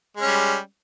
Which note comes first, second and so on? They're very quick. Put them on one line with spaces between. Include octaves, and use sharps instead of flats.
G#3 C#4 G3